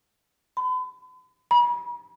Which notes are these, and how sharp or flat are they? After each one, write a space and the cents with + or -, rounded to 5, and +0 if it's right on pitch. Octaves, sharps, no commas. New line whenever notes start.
B5 +45
B5 -40